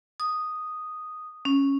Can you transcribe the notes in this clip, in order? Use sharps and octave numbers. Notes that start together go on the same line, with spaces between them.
D#6
C#4